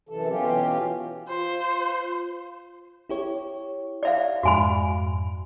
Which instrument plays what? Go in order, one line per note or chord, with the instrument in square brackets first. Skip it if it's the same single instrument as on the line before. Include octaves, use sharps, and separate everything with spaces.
[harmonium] F#2 C3 E3 A4
B2 E3 C#4 F4 G4
[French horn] F4 [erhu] C5
[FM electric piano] E4 G4 C#5
[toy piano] D5 E5 F5
[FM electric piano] F2 G#2 [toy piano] F#4 G#5 B5